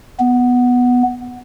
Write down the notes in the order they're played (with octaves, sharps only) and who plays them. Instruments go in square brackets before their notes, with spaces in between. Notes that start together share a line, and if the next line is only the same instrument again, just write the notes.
[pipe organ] B3